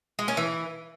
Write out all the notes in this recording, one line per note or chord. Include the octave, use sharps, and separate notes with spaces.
G#3
C#4
E3